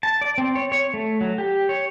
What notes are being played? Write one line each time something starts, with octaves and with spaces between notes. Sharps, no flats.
A5
D5
C4
C#5
C#5
A3
F#3
G4
C#5